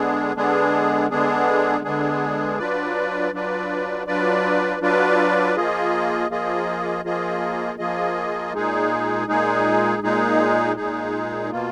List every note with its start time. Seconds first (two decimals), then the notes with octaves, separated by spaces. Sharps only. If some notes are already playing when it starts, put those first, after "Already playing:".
Already playing: D3 G#3 B3 D4 G#4
0.35 D3 G#3 B3 D4 G#4
1.10 D3 G#3 B3 D4 G#4
1.84 D3 G#3 B3 D4 G#4
2.58 F#3 D4 F4 B4 D5
3.33 F#3 D4 F4 B4 D5
4.07 F#3 D4 F4 B4 D5
4.81 F#3 D4 F4 B4 D5
5.56 F3 A#3 F4 G#4 D#5
6.30 F3 A#3 F4 G#4 D#5
7.04 F3 A#3 F4 G#4 D#5
7.78 F3 A#3 F4 G#4 D#5
8.53 A#2 G#3 D#4 G#4
9.27 A#2 G#3 D#4 G#4
10.02 A#2 G#3 D#4 G#4
10.76 A#2 G#3 D#4 G#4
11.50 B2 A#3 F4